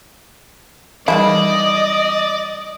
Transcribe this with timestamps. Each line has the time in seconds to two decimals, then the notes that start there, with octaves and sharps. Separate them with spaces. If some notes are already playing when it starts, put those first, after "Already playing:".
1.08 D#3 E3 G3 G#3 E4 D5 D#5